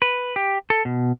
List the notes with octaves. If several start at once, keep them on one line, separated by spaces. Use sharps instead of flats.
B4
G4
A4
B2